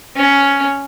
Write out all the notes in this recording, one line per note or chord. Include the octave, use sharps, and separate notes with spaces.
C#4